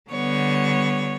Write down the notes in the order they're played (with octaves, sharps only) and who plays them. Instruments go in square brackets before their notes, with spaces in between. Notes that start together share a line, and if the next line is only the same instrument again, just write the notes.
[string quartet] D3 G3 B3 C#5